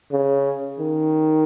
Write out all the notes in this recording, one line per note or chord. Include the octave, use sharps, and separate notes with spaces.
C#3
D#3